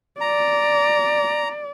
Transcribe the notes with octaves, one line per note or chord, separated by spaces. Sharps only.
D5 A#5